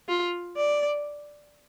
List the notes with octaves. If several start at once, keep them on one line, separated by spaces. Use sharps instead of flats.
F4
D5